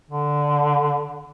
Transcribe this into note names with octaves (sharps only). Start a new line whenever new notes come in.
D3